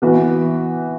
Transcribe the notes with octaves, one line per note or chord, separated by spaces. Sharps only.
E3 B3 F#4 B4